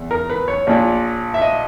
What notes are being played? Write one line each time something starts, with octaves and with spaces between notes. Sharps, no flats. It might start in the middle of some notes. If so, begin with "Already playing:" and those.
Already playing: E2
A#4
B4
C#5
A#1 A#2
E5
D#5